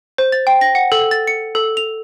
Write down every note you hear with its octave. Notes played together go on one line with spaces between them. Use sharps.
C5
A6
G5
A#6
F#5
A4
A6
C#7
A4
F7